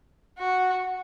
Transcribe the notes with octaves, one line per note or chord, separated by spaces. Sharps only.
F#4